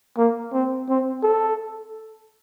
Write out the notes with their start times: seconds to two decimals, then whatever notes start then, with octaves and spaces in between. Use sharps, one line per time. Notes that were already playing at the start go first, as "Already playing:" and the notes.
0.18 A#3
0.53 C4
0.89 C4
1.23 A4